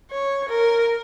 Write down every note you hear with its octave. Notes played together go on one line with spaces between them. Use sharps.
C#5
A#4